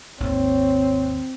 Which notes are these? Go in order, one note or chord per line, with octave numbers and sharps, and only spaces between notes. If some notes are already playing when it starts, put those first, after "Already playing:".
G#1 D#2 C4 C#5